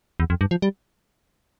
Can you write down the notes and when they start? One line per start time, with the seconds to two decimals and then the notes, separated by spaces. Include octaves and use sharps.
0.20 E2
0.30 F2
0.41 G2
0.51 F3
0.62 G3